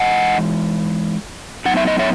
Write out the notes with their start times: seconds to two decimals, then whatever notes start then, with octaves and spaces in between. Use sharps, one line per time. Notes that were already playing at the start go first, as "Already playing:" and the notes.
Already playing: E3 G#3 D#4 D#5 F#5
1.65 A2 F#3 B3 D#4 F#5
1.77 E5
1.87 D#5
1.99 C#5 E5